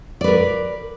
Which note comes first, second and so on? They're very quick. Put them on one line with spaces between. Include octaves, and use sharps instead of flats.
D5 B4 A#4